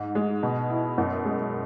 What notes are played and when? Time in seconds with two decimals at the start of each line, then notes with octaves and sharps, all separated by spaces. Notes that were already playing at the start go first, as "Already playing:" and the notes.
Already playing: G#2
0.15 G#3
0.43 B2
0.70 E4
0.98 F#2
1.25 G#3